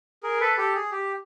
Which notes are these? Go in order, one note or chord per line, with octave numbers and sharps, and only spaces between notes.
G#4 A#4
A4 B4
G4 A4
G#4
G4